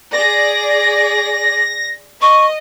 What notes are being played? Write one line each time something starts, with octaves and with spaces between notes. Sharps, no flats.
G#4 D5 A#6
D#5 C#6